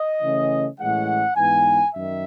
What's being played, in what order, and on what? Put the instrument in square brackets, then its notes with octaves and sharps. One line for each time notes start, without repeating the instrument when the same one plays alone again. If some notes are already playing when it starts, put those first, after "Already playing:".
Already playing: [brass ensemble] D#5
C#3 E3 A3 C#4
A2 E3 G#3 C#4 F#5
G#2 E3 B3 G#5
F#2 D#3 E5